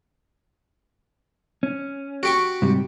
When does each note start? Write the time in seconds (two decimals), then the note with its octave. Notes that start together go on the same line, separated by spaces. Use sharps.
1.63 C#4
2.23 F#4 G4 C#6
2.62 G#2 C3 G3